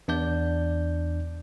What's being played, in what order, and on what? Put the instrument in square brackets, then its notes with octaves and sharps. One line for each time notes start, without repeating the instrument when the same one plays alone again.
[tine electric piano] E2 D4 D5 G6